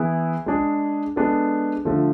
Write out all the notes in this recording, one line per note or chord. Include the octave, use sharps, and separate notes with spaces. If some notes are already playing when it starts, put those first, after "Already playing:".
Already playing: E3 B3 E4 G#4
G#3 D4 G#4
G#3 B3 D4 A4
D3 F3 A3 D4 A4